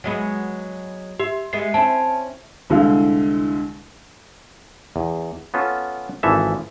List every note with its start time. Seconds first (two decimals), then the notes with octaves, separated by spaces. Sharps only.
0.04 F#3 G#3 B3
1.20 G4 E5
1.53 G#3 B3 E4 C7
1.74 C4 C#4 E4 A5
2.70 C2 D3 G#3 E4 F5
4.96 E2
5.54 B3 C#4 F4 A4
6.23 G#1 E3 F3 A4 E5